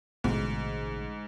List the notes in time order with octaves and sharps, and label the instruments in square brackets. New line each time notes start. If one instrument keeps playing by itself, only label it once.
[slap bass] A1 B2 D3 [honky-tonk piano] G#2